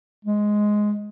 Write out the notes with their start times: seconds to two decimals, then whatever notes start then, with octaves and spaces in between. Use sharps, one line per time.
0.25 G#3